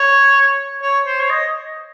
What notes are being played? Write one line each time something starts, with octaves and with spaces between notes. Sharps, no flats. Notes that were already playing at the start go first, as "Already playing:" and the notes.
Already playing: C#5
C#5
C5
C#5
D#5